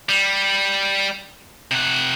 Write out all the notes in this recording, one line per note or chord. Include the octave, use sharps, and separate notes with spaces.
G3
C3 F#5